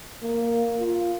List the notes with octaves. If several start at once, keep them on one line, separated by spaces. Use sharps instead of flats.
A#3
F4